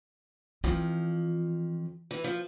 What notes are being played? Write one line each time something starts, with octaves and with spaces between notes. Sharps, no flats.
F2 E3 F3
E3
F3